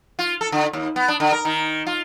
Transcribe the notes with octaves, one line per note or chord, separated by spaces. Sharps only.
F4
A4
D3
D#2
B3
D4
D3
A#4
D#3
F4